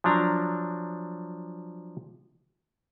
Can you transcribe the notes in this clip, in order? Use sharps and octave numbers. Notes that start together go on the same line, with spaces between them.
F3 F#3 D4 A#5